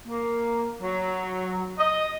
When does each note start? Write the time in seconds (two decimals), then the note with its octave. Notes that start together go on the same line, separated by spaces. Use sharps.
0.06 A#3
0.82 F#3
1.79 D#5